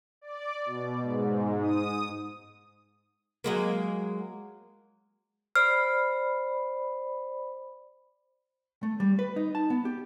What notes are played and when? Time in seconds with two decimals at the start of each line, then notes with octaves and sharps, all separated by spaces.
0.21 D5
0.66 B2
1.02 G#2
1.62 D#6
3.44 F#3 G#3 A#3
5.56 C5 D5 B5 F6
8.83 A3
9.00 G3
9.19 B4
9.36 D#4
9.55 A5
9.70 B3
9.85 G4